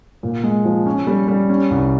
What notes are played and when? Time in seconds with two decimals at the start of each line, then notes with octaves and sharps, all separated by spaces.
0.23 A#2
0.43 G#3
0.65 F3
0.86 C#4
1.07 G3
1.28 G3
1.49 C#4
1.70 C2